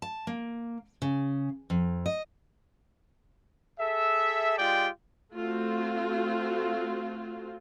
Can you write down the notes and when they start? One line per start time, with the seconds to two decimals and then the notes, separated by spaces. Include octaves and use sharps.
0.02 A5
0.27 A#3
1.02 C#3
1.70 F2
2.06 D#5
3.80 G#4 A4 E5
4.58 G#3 F4 G4 D5 G5
5.34 A3 C4 F4 F#4